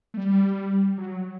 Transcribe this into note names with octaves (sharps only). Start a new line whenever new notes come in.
A3
G3
F#3